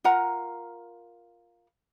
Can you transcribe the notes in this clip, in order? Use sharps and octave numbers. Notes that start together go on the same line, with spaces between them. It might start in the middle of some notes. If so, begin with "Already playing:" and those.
F4 A#4 F#5 A#5